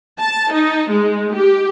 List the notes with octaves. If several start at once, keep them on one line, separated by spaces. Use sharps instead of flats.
A5
D#4
G#3
G4